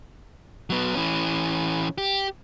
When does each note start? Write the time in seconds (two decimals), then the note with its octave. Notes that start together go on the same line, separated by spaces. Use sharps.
0.70 F#3 B3
0.94 E3 C#4
1.98 G4